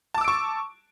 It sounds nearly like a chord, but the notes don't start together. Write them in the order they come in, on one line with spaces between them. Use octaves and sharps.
A5 D6 E6 D7 C#6